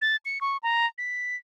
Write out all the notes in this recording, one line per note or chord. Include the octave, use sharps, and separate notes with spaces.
A6
C#7
C#6
A#5
B6